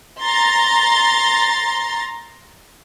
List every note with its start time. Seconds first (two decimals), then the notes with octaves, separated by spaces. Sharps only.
0.22 A#5 C6 A6